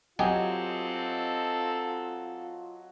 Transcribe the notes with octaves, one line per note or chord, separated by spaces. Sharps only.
F#3 C4 F4 G4 A4 D#5 G#5